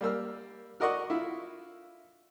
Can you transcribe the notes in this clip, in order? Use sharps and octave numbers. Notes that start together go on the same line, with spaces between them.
G3 A#3 E6 F6
F#4 A#4 D5 D#5 F#5 C#6
E4 F4